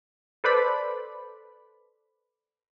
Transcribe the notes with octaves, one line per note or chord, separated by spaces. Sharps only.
A4 B4 C5 D5 B5